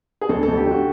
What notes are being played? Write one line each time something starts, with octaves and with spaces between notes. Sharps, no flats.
G#4
D2 A4
A4
D2
G4
D2 F#4